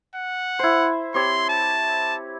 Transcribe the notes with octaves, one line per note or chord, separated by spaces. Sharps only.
F#5
E4 C5
C4 G4 C#5 C6
A5